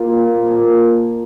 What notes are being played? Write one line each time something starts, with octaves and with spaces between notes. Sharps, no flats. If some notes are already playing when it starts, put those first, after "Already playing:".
Already playing: A#3 F4 G4 A#4
A#2 G3 C4
A#2 F3 A#3